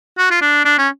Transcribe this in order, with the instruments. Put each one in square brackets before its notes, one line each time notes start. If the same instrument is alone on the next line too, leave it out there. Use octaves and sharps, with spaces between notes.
[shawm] F#4
F4
D4
D4
C#4